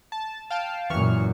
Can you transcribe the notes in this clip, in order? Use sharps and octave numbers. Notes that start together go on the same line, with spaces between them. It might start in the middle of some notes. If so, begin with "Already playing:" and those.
A5
F5 G5 A5
F#2 A#2 E3 C#6 F6